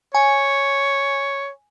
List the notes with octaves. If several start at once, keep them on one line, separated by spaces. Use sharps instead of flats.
C#5 G#5